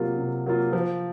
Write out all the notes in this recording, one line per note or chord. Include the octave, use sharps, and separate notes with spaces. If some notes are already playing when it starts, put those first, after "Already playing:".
Already playing: C3 F#3 A#3 F4
C3
F#3 A#3 F4
F3